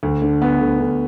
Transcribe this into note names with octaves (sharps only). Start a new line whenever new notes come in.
D2
D3
B3
D2
D2